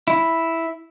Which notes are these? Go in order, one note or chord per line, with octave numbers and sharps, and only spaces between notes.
E4